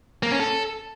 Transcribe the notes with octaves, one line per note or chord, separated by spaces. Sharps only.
A#3
C#4
A4